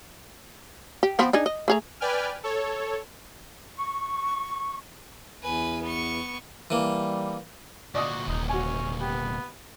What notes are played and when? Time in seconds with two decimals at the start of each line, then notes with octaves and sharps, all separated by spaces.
1.03 G4
1.19 F3 B3 C4
1.33 D4 D#4 G#4
1.46 D#5
1.68 A3 G#4 A#5
2.00 B4 D5 G5 G#5 F6
2.44 A4 C#5
3.76 C#6
5.43 E2 B4 G#5
5.83 B3 C#6
6.70 E3 G3 A#3
7.95 D2 A#2 F#4 D5 D#5 D#6
8.28 D#1 D#4
8.49 C#4 F#4 G#5
9.01 B3 G4